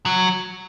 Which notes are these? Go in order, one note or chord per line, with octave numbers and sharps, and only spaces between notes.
F#3